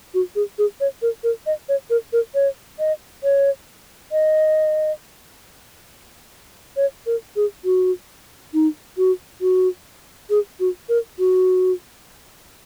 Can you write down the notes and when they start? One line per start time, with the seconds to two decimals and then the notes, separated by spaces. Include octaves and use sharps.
0.14 F#4
0.36 G#4
0.58 G#4
0.80 C#5
1.02 A#4
1.24 A#4
1.46 D#5
1.69 C#5
1.90 A#4
2.13 A#4
2.35 C#5
2.79 D#5
3.24 C#5
4.12 D#5
6.77 C#5
7.06 A#4
7.36 G#4
7.65 F#4
8.54 D#4
8.98 F#4
9.41 F#4
10.30 G#4
10.60 F#4
10.89 A#4
11.19 F#4